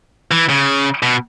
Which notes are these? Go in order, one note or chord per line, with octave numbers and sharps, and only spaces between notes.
E3
C#3
B2